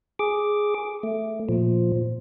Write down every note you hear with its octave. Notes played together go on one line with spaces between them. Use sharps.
G#4 D6
A3
A#2 F3